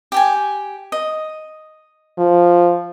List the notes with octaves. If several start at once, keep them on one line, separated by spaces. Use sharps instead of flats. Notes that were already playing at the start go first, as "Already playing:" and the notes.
G4 G5 G#5
D#5
F3